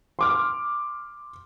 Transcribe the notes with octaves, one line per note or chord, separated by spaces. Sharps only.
C6 D6 F6